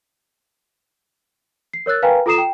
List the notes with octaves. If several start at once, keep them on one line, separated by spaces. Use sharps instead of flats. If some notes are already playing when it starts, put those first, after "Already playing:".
C7
A#4 C#5 E6 F#6 A6
A#4 B4 F5 G5 G#5 A#5
F4 A4 A#5 D#6 C7 E7
G5